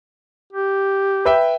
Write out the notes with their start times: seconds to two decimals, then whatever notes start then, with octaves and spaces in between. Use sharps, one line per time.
0.53 G4
1.25 B4 E5 G5